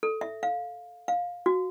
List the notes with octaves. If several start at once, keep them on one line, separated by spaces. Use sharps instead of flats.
A4
E5
F5
F5
F#4